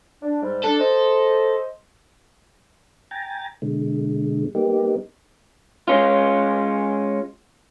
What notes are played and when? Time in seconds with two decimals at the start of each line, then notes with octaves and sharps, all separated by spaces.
0.22 D4
0.43 G#2 G3
0.64 D4 A4
0.80 C5 D#5
3.11 G5 G#5 A#5 A6
3.62 B2 D3 G#3
4.55 G3 A#3 B3 D#4 G4
5.88 G#3 C#4 F4